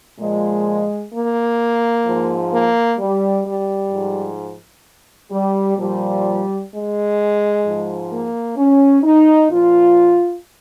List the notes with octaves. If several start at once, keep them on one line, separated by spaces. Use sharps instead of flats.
A#2 F3 G#3
A#3
G#2 F3
A#3
G3
G3
G#2 F3
G3
A#2 F3 G3
G#3
G#2 F3
A#3
C#4
D#4
A#2 F3 F4